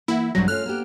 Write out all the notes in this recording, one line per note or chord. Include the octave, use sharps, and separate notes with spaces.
E3 A#3 E4 F#5
A#1 G2 C3 F#3 G3 A#6
A3 C#4 F4 F6 F#6
A#3 B3 G4